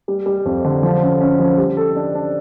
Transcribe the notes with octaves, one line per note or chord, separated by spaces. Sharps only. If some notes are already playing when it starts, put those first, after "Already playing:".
G3
G3
F2
D3
F3
C#4
C#4
F3
G3
A4
D4
D4